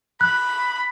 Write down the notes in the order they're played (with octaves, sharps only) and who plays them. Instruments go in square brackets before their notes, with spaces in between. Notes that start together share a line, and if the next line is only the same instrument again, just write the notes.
[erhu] B5 [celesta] F#6